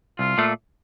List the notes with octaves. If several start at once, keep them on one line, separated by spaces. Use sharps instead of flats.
C2 F4
A#2 A3